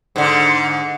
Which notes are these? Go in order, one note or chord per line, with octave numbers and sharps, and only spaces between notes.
G#2 D3